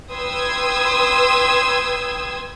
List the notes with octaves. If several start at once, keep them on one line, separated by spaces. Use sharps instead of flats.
B4 G5 C6 D#6 E6 G#6